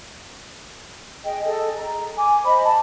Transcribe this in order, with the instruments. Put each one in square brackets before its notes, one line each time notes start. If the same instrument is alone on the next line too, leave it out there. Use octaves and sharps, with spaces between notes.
[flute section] G#4 D#5 G5
G#4 A4 D#5
A#5
G#5 D6
C5 D#5 B5
A5